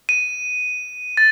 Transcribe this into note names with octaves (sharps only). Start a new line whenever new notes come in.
D#7
A6